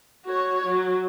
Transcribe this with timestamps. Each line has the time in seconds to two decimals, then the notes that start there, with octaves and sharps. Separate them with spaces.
0.25 F#4 C#5
0.66 F#3